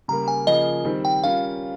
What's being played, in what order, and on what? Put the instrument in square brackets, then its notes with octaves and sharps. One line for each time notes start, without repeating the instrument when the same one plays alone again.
[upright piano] C#3 G3 A#3 [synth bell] A#5
[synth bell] G#5
[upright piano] C#3 F3 A#3 F4 G#4 [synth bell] D#5
[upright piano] D#3 G3 C4
[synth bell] G5
[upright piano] G3 C#4 F4 A#4 [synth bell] F5